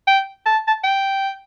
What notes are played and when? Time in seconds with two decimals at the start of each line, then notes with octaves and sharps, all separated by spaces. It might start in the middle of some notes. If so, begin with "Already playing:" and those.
0.07 G5
0.46 A5
0.68 A5
0.84 G5